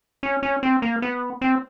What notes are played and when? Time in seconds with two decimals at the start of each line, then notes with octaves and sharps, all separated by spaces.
0.23 C#4
0.43 C#4
0.63 C4
0.82 A#3
1.02 B3
1.41 C4